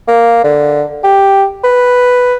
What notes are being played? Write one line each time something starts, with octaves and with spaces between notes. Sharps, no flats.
A#3
D3
G4
B4